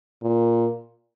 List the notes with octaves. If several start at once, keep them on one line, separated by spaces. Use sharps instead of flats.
A#2